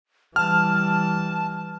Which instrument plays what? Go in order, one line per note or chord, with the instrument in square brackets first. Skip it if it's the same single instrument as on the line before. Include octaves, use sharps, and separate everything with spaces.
[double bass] E3 G3 [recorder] A5 [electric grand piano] F6